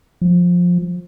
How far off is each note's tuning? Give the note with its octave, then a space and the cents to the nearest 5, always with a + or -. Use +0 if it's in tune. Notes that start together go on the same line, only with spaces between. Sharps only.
F3 +15